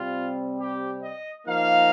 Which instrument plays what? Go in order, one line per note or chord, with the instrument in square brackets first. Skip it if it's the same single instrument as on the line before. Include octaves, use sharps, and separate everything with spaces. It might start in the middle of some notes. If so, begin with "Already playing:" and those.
Already playing: [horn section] C3 G3 C4 F4
G4
D#5
F3 A#3 D#4 F5